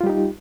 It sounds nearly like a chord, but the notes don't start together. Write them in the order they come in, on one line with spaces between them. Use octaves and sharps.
F4 G3 G4 D#4